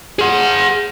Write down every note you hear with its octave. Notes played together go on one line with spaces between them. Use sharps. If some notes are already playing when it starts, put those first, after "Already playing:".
G#4 F#5